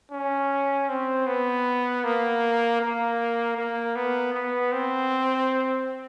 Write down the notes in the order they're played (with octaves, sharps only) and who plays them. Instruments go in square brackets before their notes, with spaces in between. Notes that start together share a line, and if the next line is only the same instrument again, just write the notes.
[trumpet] C#4
C4
B3
A#3
A#3
A#3
B3
B3
C4